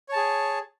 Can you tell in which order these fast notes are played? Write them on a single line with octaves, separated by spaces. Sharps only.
C#5 A5 G#4